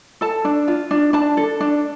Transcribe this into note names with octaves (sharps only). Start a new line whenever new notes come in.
A4 A5
D4
F4
D4
D4 A5
A4
D4